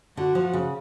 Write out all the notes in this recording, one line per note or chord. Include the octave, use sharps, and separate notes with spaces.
D3 F#4
F3
C#3